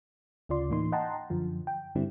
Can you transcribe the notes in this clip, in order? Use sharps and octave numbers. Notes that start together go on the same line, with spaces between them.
D2 C#3 F4 D5 C6
A2 E3 A#3 D#4 C6
D#5 F#5 G5 A5 A#5 C6
F#2 D3 F3
G5
G2 D3 G3 C4 E4